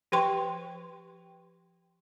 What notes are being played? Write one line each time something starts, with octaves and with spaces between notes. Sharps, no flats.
F3 G4 B4 G5 C6 C#6